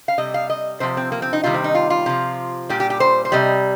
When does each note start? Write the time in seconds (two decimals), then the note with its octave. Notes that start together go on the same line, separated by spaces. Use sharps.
0.08 F5
0.18 C3 G3 D#5
0.34 F5
0.50 D#5
0.80 C3 F3 C5
0.97 C4
1.12 A#3
1.22 C4
1.33 D#4
1.43 C3 D#3 G3 F4
1.54 C4
1.64 D#4
1.75 F4
1.90 F4
2.06 C3 F3
2.69 A#2 G3 G4
2.80 G4
2.90 G4
3.00 C5
3.25 C5
3.32 C3 G3 D#5